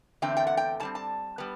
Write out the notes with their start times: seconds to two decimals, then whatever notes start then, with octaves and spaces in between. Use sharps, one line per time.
0.22 E2 D3 A3 C4 G5
0.37 G5
0.47 F#5
0.57 G5
0.80 B2 A5
0.83 G3 C4
0.95 A5
1.38 G3 B3